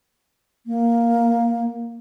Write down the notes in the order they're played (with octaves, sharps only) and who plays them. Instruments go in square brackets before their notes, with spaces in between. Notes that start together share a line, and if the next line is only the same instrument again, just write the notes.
[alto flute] A#3